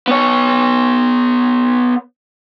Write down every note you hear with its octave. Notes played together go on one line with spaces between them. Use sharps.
B3 C#5